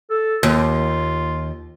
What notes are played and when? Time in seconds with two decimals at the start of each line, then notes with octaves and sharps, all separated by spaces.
0.10 A4
0.43 D#2 F4